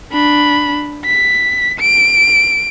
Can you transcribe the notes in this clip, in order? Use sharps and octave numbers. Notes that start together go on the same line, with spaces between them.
D4 B5
B6
D7